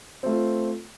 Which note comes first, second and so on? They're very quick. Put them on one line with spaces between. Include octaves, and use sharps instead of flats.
C4 A3 F4